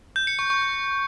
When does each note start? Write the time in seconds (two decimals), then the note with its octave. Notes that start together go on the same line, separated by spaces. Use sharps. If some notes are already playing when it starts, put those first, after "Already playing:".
0.16 G6
0.27 C#7
0.39 C#6
0.50 C#6